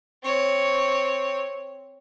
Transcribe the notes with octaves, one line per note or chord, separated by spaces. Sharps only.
C4 C#5